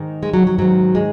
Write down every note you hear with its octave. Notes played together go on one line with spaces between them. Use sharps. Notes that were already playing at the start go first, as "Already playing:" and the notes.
Already playing: G#2 D#3
G#3
F#3
F#3
G#2 D#3 F#3
G#3